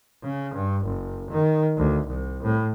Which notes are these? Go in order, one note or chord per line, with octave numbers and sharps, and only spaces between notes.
C#3
G2
F#1
D#3
D2
C2
A2